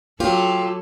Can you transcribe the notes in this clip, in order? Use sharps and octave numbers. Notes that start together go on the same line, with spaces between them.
F#3 F4 G4 A4